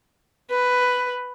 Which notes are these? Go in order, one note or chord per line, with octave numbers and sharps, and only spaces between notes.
B4